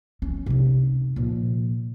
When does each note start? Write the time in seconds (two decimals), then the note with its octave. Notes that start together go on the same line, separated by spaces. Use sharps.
0.22 C#4
0.46 C3 D#4
1.16 A#2 F3